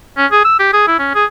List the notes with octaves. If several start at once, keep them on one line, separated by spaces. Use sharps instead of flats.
C#4
G#4
E6
G4
G#4
E4
C#4
G#4